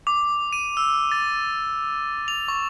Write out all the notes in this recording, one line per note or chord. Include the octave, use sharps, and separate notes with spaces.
D6
D#7
E6
A6
F7
C#6